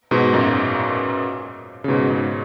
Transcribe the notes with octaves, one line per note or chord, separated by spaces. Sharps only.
G#2 B2
F#2 A#2
C#3
G#2 B2
G#2